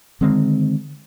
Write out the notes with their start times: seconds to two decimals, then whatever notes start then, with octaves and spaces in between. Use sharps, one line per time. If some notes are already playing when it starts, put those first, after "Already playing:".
0.21 D3 D#3 G#3 C4